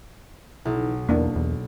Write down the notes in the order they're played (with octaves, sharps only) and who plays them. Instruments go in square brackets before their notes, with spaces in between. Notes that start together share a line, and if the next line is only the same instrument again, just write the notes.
[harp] B1 [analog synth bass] E3
[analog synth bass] E2 [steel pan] A#3 D4 E4
[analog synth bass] E2